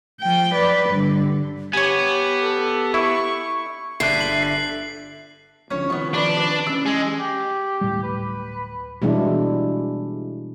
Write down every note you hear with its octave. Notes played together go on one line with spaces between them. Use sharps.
F3 G5
B4 D5
G2 D3
B3 G4 C#5 G#5
A4
E4 C#6
G1 D3 E5 F#6 C7
F#7
C7
C#2 D3 F3 C#4 C#5
C3 D#3 F3 B3 C#6
D4 B4 D5 C6
B4 D5
E3 C#4 E6
G#3
G4
D1 A2 G3
B4
B2 E3 G3 G#3 D4 E4